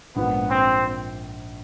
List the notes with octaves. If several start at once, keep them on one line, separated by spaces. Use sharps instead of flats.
A#1 G#2 F3 B3
C4